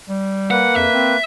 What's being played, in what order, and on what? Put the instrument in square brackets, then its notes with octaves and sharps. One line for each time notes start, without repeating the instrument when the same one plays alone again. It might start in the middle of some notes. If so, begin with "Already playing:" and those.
[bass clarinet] G3
[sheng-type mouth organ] A#3 B4 [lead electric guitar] F#5
[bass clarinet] F2 [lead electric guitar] E5
[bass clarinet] C4